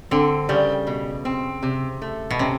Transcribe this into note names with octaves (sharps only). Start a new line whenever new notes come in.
D3 C4
C#3 G3
B2
C4
C3
A3
B2
C3 C#4